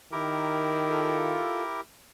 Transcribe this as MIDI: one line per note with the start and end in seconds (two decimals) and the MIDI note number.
0.12 1.43 51
0.12 1.81 64
0.12 1.81 67
0.12 1.81 70
0.89 1.63 65
0.89 1.63 69